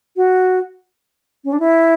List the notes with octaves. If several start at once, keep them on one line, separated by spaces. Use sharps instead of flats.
F#4
C#4
D4
E4